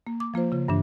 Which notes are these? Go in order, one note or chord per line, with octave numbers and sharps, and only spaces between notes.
A#3
D6
F3 A#3 F4 C5
C#3 F4
G2 E3 D4